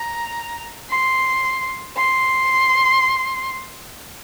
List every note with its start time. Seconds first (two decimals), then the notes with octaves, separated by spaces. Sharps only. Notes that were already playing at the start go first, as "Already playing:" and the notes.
Already playing: A#5
0.90 C6
1.97 C6